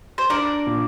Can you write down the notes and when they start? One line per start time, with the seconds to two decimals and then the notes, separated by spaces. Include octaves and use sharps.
0.18 C5
0.30 D4 A#4 D5
0.67 A#2